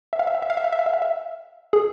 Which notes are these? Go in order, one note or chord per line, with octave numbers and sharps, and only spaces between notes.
E5
F5
E5
F5
E5
F5
E5
F5
E5
F5
E5
F5
E5
G#4